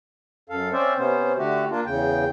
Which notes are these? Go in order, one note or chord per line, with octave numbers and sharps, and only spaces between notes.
F#2 A4 F5
C4 C#4 C5 D5 E5
C3 B3 C#4 C5
D3 A3 F#4 G4
A#3 D4 F4
E2 C#3 G5